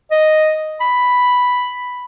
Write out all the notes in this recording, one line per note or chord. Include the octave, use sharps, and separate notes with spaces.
D#5
B5